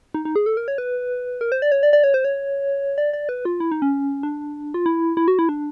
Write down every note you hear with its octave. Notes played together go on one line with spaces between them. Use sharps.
D#4
D#4
G#4
A4
A#4
C#5
B4
A#4
C5
D5
C#5
D5
D5
C#5
C5
C#5
D5
D5
B4
F4
E4
D#4
C#4
D4
F4
E4
E4
F#4
E4
D4